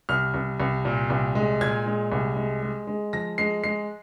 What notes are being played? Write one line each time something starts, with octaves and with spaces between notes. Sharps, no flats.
C2 F6
C2
C2
A#2
C2
G#3
A#2 G#6
G#3
C2
G#3
G#3
G#3
F3 A#6
G#3 C7
G#3 C7